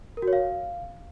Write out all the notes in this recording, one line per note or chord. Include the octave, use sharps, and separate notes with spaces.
A#4
F#4
C#5
F5